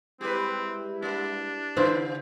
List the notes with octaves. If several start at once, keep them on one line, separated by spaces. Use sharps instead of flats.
G3 G#3 C4 E4 G4 B4
A#3 D4
C#3 E4 B4 C5